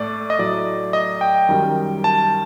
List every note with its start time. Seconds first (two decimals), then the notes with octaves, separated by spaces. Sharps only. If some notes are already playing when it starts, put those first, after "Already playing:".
Already playing: A2 A3 D5
0.30 D#5
0.39 A2 F#3 A3 D5
0.93 D#5
1.21 G5
1.49 F#2 D#3 G3
2.04 A5